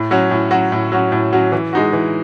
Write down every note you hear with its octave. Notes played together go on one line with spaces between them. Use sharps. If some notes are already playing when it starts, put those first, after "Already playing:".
Already playing: A2
F#3 C#4 F#4
A2
F#3 C#4 F#4
A2
F#3 C#4 F#4
A2
F#3 C#4 F#4
E3
G#3 D#4 F#4
E3